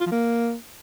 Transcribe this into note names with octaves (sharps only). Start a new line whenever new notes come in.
F4
F3
A#3